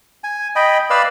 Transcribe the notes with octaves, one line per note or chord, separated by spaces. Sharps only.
G#5
D#5 G5 B5
B4 D5 F5 E6